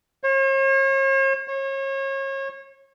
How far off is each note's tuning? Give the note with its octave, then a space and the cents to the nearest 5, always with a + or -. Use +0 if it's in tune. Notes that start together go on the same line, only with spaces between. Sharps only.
C#5 -45
C#5 -35